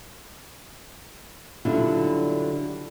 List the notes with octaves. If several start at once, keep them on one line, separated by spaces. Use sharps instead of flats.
D3 F#3 G3 D4 E4 F4